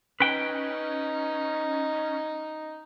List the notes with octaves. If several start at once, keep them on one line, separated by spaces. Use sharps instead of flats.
C#4 D#4 B4 G5